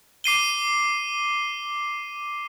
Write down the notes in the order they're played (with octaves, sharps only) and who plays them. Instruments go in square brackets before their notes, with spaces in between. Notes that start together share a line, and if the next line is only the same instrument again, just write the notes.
[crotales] D6 C7 D#7 G7